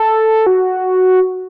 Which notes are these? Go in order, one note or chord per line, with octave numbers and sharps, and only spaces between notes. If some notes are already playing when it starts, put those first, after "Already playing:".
Already playing: A4
F#4